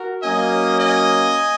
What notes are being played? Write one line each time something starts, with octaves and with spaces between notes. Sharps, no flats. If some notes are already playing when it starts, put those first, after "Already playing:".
Already playing: F#4 A#4
F#3 A#3 C#4 D#5 G#5
D#5 G#5